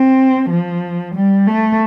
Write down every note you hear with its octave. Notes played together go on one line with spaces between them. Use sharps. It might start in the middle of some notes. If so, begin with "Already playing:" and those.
Already playing: C4
F3
G3
A3